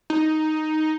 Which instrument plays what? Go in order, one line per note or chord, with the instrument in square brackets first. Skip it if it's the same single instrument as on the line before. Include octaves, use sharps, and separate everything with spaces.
[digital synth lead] D#4